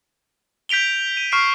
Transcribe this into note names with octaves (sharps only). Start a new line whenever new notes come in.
G6 B6 D7 F7 G7
D#7
C#6 F6 C7 D7